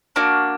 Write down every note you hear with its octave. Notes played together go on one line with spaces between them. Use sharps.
A#3 D4 F#4